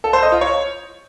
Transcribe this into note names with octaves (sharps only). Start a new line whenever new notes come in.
A4
C5
D#5
F4
C#5